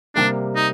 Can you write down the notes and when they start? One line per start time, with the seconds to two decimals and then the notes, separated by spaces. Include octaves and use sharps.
0.15 C3 G3 A#3 D4
0.56 D#4